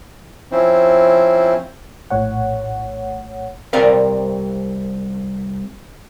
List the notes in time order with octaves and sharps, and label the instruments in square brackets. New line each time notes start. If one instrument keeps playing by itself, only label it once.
[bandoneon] F3 C4 C#4 E4 C5
[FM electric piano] A#1 A2 C#5 F#5
[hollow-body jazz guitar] C2 C4 A#4 D5 F5